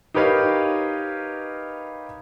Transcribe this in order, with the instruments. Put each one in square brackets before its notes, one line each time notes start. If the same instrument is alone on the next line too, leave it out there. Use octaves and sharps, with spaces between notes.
[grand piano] D#4 G4 A#4 B4 C#5 F5